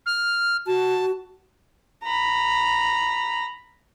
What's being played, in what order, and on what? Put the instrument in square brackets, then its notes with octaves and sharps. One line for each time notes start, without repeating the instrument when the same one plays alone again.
[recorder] F6
[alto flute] F#4 [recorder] A5
[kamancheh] A#5 B5